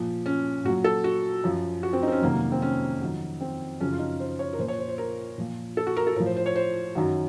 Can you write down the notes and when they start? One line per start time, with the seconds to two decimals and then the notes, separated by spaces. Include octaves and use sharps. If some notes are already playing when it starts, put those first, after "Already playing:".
Already playing: A#2 F3
0.26 C#4
0.65 A#2 F#3 F#4
0.84 A4
1.04 F#4
1.44 F#2 F3
1.83 F#4
1.93 C4
2.03 D#4
2.08 C4
2.12 C#4
2.22 F2 C3 D#3 F#3 A#3
2.32 A#3
2.52 C4
2.62 C#4
3.02 F2 D#3 F#3
3.41 C4
3.80 F#2 C#3 F3 C#4
3.93 F4
3.99 D#4
4.20 C5
4.39 C#5
4.53 A#4
4.59 A#2 F3 C5
4.68 C#5
4.78 C5
4.88 C5
4.98 A#4
5.38 A#2 F3
5.77 A4
5.87 F#4
5.97 A#4
6.07 A4
6.16 A2 A#4
6.20 F3
6.26 C5
6.37 C5
6.46 C#5
6.56 C5
6.95 F#2 D#3 F#3